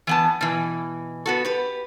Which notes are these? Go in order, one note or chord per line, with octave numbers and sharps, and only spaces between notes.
E3 B3 A5
B2 E3
B3 F#4 A4
G4 B4